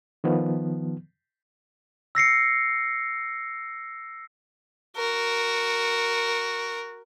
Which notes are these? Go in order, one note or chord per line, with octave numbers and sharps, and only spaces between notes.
D#3 F3 B3
E6 A#6 C7 C#7
F#4 A#4